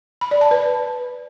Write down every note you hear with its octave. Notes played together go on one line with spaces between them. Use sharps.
B5
D5
A5
B4